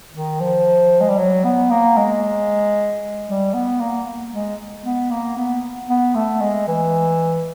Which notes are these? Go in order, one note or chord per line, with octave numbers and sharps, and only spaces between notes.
D#3
F3
G#3
G3
F#3
B3
A#3
G#3
G3
B3
A#3
G#3
B3
A#3
B3
B3
A3
G#3
E3